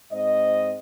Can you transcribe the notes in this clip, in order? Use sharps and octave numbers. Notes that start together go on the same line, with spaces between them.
G#2 C4 D#5